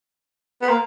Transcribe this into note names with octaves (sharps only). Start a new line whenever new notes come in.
B3
A#3